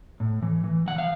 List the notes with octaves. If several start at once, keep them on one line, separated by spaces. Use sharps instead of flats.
A2
E3
E3
E3 F#5
F5